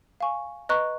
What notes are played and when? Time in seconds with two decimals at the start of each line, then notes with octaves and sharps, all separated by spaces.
0.20 F5 G#5 C#6
0.69 B4 D#5 A#5 C#6 F#6